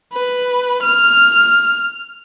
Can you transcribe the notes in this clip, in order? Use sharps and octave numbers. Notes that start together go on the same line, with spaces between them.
B4
F6